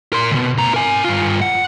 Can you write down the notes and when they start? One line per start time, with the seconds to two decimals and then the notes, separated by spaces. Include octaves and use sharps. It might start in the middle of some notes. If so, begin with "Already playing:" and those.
0.13 A#4 C6
0.32 C#2 B2
0.58 A2 A#5
0.74 A#4 G#5
1.04 G2 F4
1.41 F#5